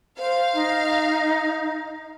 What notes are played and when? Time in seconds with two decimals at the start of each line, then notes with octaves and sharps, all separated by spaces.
0.18 C5 F5
0.54 D#4